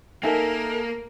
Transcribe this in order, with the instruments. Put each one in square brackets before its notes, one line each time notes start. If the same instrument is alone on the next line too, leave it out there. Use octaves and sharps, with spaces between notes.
[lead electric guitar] A#3 [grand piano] D#4 E5 G#5 [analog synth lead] A4 [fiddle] A#4